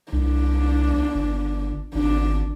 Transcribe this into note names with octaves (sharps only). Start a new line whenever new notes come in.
C2 D4
G1
G#1 D4